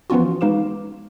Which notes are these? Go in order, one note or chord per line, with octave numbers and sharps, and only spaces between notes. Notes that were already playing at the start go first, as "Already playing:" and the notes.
E3 F3 B3 C#4 F4 F#4
G#3 D#4 B4 F5 D6 E7